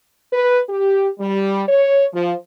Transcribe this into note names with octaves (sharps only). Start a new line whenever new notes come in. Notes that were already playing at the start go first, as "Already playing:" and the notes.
B4
G4
G3
C#5
F3